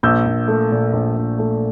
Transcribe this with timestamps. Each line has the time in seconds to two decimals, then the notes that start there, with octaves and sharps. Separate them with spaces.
0.03 A#1 E6 G6
0.26 A#1
0.48 A3
0.71 A#2
0.93 A#1
1.15 A#1
1.39 A3